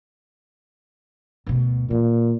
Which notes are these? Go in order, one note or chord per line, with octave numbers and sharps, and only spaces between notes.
D2 B2
A#2 E3